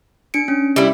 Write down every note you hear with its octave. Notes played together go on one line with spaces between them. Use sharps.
D4 C#7 D7
C#4
G3 E4